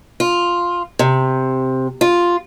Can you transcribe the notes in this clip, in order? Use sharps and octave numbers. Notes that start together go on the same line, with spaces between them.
F4
C3
F4